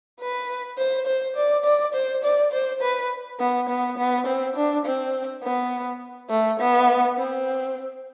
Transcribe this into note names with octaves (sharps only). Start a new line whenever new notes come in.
B4
C5
C5
D5
D5
C5
D5
C5
B4
B3
B3
B3
C4
D4
C4
B3
A3
B3
C4